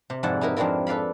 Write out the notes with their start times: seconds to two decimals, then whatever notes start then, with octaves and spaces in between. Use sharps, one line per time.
0.10 C3
0.23 F2 G#2 E4 D5 F#5 A5
0.41 D#4 E4 A#4 B4
0.56 F2 C4 D4 E4 F4 A#4
0.87 A4 B4 D5 F5 B5